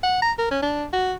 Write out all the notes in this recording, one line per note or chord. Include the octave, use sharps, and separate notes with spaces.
F#5
A#5
A#4
C#4
D4
F#4